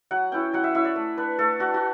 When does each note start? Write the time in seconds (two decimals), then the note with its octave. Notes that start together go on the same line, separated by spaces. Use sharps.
0.11 F#3 F#5
0.32 C#4 E4 G5
0.53 F#3 F#5
0.64 E5
0.74 C#4 E4 E5
0.85 D5
0.96 A3
1.17 D4 B4
1.39 A3 A4
1.59 D4 F#4
1.74 F#4